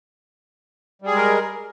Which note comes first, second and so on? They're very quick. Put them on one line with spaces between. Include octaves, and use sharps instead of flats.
G3 G#4 G#3 A#4